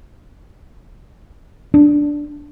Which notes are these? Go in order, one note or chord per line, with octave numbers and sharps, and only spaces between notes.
D4